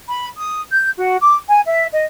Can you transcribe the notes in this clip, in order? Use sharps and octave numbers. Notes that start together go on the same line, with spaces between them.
B5
D#6
G6
F#4
D6
G#5
E5
D#5